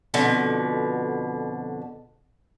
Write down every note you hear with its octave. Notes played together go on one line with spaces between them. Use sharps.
F2 B2 D3